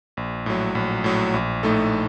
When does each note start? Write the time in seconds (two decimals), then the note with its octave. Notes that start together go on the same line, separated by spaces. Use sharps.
0.17 A#1
0.46 A2 F#3
0.75 A#1
1.04 A2 F#3
1.34 A#1
1.63 A2 A3 D#4 A4